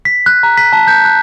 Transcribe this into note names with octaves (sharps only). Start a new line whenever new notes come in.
B6
F#6
A#5
B6
A5
G6
F#6